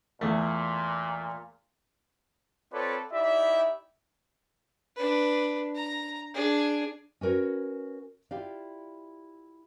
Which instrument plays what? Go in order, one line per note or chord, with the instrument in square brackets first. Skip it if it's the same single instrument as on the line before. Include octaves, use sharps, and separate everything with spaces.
[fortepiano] E2 A3 [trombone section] A#2
[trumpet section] C4 F4 A4 B4 C#5 D5
D#4 E4 G4 D5 E5
[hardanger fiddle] D4 B4
A#5
D4 G#4
[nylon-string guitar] C#4 F#4 A#4 B4 C#5
E4 F4 G4 D5 F5